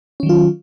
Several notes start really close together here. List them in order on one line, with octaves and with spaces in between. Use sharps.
C#4 D#3 F#3 F4